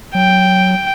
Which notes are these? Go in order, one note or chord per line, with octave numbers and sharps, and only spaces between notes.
F#3 G5